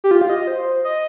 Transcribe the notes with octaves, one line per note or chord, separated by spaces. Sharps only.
G4
F4
F5
D#5
C5
D#5